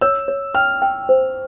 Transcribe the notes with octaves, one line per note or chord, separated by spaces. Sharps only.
C#5 E6
C#5
G5 F6
G5
C5